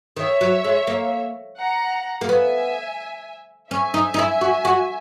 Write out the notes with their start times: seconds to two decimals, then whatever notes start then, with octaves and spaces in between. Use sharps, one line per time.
0.17 D#3 C#5 E5
0.41 F#3
0.64 G#3
0.87 A#3
1.58 F#5 A#5
2.21 A#3
2.29 B3 E5 G#5
3.71 C#4 E5 G#5
3.94 D#4
4.14 D#4
4.19 E4
4.41 F#4
4.65 F#4